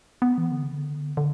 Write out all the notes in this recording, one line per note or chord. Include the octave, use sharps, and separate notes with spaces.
B3
E3
D3
C#3
D3
D3